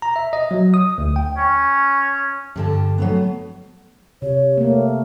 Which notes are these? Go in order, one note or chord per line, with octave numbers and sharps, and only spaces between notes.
A#5
E5
D#5
F#3
D#6
D2
G5
C#4
G2 D3 A5
F#3 A3 B3
C3 C#5
A3 A#3